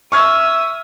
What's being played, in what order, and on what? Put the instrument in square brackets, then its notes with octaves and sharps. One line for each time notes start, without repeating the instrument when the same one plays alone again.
[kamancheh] E5 D#6 [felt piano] C#6 F6 G#6